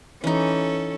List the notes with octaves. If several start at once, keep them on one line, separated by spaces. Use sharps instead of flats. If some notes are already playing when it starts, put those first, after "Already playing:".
E3 C#4 D#4 A4